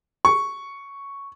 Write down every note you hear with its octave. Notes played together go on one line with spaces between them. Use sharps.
C#6